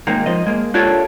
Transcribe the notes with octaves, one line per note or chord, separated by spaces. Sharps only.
D#3 G#3 A#3 C4 D#4
F3 D#5
G#3 A#3
D4 F4 G4 A4 A#4 C#5